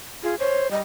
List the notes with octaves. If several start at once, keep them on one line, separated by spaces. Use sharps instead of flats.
F4 G#4
C5 C#5
G3 D#5